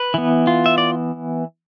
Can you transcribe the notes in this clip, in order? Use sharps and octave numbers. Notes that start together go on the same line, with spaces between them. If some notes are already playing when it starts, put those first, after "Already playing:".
Already playing: B4
E3 B3
F4
E5
D5